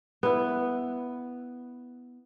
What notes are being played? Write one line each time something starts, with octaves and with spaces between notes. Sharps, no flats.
B3 E4